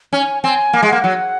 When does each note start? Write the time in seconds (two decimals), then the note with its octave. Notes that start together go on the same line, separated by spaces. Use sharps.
0.13 C#4 G#5
0.43 C4 G#5
0.73 A#3
0.83 G#3
0.88 A#3 F#5
1.04 F#3